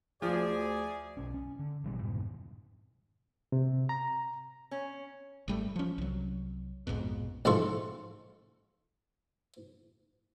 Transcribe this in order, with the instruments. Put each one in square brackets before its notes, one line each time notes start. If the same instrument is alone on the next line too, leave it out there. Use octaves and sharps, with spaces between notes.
[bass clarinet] D2 [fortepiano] F3 [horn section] G#4 D5
[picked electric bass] B1 C#4
C#4
D3
A1 B2 G3
F2 G#2 B2 D#3
[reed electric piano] C3
A#5
[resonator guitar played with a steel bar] C#4
[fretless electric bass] G#1 G3 A3
F3 C#4
C2 F#3
A#1 F2 G#2 B2
[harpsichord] A1 G#2 F4 A4 C#6